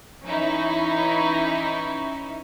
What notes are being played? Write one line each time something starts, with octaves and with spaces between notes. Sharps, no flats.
E3 C#4 D#4 E4